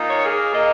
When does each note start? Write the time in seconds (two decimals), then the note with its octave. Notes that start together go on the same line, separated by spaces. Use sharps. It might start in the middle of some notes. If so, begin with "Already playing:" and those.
Already playing: A#2 D#4
0.09 C#5
0.23 A#3 G#4
0.52 A#2 D#5